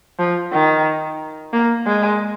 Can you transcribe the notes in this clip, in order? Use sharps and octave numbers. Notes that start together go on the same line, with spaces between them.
F3
D#3
A#3
G#3